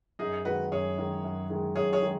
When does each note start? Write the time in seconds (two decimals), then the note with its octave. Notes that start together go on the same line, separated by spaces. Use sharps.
0.19 F#2 D#4 G#4
0.45 D#3 G#3 F#4 B4
0.72 F#2 G#4 C#5
0.98 D#3 G#3
1.24 F#2
1.50 D#3 G#3
1.75 F#2 G#4 C#5
1.93 G#4 C#5
2.02 D#3 G#3